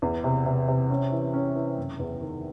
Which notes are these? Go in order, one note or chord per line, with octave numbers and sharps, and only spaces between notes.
E2
C3
C3
C3
C#4
E3
C#4
E3
F#1
E2
D#3